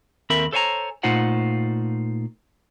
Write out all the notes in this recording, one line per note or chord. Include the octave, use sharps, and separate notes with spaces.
D#2 C4 A4 A#4 E5 B5
A4 C5 C#5 E5 G#5 A#5
A#2 A3 D#4 F4 C5 F#5